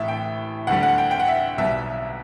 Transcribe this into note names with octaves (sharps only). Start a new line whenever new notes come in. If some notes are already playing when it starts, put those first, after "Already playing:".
Already playing: A1 A2 E3 E5
G5
D2 D3 G3 F#5
F#5
G5
G5
F#5
E5
B1 B2 G3 E5